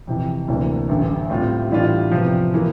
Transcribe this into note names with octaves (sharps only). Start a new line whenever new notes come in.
F2 C3 E3
D2 C3 E3 A#3 D4
A1 G2 D3
A2 G3 C4 F4
A2 E3 G3 D4 F4
E2 C3 F3
E3 A#3